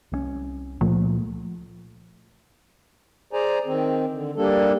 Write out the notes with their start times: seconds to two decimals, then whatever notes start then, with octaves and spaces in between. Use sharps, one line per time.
0.12 C2 F3 C#4
0.81 C#2 A#2 F3 A3
3.33 G#4 C5 D5 G#5 A#5
3.66 D#3 C4
4.12 D3
4.36 G3 A#3 D4 A4